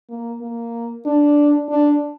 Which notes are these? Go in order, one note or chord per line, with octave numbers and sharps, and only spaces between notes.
A#3
A#3
D4
D4